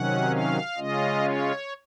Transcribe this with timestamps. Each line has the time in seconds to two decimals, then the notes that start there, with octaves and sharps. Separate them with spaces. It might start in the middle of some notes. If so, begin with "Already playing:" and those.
Already playing: C3 D#3 F#3 C#4 F#5
0.30 F5
0.77 C#3 G#3 C#4 F4 D#5
1.24 C#5